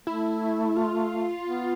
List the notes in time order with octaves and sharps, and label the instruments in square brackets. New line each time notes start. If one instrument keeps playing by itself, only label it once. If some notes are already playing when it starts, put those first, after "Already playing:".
[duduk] A3 [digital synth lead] E4
[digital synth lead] F4
[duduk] B3